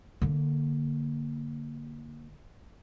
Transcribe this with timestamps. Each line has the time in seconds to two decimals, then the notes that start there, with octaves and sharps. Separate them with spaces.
0.22 D3 A#3